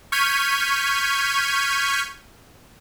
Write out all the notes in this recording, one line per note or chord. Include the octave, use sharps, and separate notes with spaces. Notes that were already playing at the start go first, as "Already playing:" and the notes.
C#6 F6 G6 G#6 B6 D#7